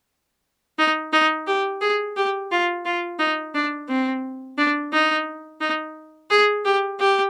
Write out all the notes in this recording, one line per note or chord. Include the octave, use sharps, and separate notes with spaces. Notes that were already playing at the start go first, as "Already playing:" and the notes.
D#4
D#4
G4
G#4
G4
F4
F4
D#4
D4
C4
D4
D#4
D#4
G#4
G4
G4